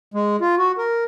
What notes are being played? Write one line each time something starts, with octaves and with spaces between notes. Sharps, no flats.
G#3
F4
F#4
A#4